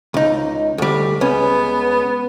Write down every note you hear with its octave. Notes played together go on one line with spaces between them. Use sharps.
C#2 D#4
D2 G3
C#2 B3 C#4